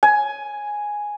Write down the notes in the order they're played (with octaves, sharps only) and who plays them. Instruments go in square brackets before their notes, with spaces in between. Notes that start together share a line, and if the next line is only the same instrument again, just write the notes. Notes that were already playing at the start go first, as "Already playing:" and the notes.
[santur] G#5